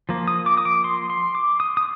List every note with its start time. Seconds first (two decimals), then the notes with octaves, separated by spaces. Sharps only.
0.09 F3 A#3
0.28 D#6
0.46 D6
0.57 D#6
0.65 D6
0.84 C6
1.10 C6
1.35 D6
1.60 D#6
1.77 D#6